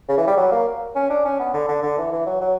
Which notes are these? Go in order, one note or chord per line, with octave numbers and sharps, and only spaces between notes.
C#3
E3
G3
F#3
A#3
C#4
D4
C#4
B3
D3
D3
D3
E3
E3
F#3
F#3